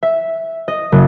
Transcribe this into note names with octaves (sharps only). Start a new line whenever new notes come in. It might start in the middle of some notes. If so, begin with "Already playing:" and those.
E5
D#5
F#1